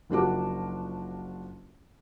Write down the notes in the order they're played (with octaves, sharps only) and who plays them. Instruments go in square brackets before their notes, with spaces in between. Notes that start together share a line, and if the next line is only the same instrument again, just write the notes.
[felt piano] F#1 F3 D4 F#4 D6